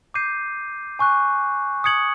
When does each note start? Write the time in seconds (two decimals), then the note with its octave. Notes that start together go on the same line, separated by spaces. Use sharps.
0.14 D6 G6 C7 D#7
0.99 G#5 C#6 F#6
1.84 D#6 G#6 C#7 F#7